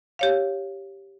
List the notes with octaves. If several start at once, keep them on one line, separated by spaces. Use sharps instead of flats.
G4 C#5 F5